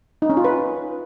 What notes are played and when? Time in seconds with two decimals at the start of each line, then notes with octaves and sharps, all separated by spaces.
0.22 D#4
0.30 C#4
0.37 F4
0.44 B4